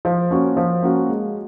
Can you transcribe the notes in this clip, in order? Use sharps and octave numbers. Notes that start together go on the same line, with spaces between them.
F3
A#3 C#4 F#4
F3
A#3 C#4 F#4
G#3